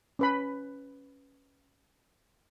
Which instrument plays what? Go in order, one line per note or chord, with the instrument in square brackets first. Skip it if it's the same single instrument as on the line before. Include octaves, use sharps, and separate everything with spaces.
[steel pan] C#4 B4 B5